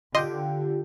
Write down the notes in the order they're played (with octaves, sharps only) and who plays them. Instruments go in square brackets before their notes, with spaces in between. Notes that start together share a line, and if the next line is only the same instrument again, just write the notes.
[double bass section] D3 [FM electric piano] F4 G4 G5 [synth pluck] D#5 C6